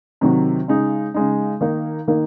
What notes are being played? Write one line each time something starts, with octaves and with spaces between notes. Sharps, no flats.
C3 D#3 F#3
C#3 G#3 D#4
C#3 G#3 D#4
D#3 A#3 D#4
D#3 A#3 D#4